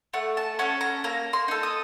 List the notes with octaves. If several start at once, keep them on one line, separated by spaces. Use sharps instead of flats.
A3 F#5
A5
C#4 A4 F#5
A#5
A#3 A#5
C6
D#4 A4
D#6